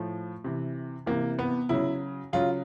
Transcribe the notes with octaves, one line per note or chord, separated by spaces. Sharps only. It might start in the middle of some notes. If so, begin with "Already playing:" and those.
Already playing: A2 F3
C3 E3
C3 E3 A#3
B3
C#3 F#3 E4
C#3 F#3 F4